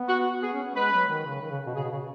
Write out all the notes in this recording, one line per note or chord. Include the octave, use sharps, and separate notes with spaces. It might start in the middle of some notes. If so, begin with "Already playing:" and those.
Already playing: B3
F#4
B3 G#4
C#4
B3
G#3 B4
F#3
D#3
C#3
D#3
C#3
B2
C#3 G#4
B2
C#3